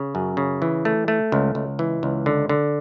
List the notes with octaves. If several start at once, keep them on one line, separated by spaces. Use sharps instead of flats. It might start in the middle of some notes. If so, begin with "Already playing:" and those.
Already playing: C#3
F#2
C#3
E3
A3
A3
C#2
C#2
E3
C#2
D3
D3